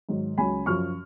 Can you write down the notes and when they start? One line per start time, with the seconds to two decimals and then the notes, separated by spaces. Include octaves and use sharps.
0.09 G#2 D#3 F#3
0.38 C#2 C#3 F#3 G#5 B5
0.66 F#2 F3 C#6 F6